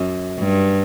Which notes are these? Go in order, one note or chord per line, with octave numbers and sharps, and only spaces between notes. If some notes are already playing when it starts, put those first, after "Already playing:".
Already playing: F#2
G2